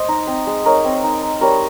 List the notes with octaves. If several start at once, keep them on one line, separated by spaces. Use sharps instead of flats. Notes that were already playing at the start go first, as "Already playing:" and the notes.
Already playing: C5 D#5
D#4
C4
G#3
D#4 A#4 C#5
C4
D#4
D#4
G3 A#4 C#5